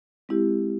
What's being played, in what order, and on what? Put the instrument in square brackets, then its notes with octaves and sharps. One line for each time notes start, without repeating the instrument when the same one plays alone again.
[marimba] G#3 C4 E4 G4